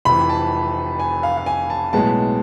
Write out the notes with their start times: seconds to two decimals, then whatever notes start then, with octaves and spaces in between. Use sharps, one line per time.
0.05 F1 F2 E3 B5
0.29 A5
0.99 G#5
1.23 F5
1.37 F5
1.46 G#5
1.70 A5
1.93 B1 A2 G#3 B3 A5